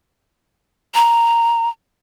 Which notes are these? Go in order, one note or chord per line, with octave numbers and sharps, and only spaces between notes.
A#5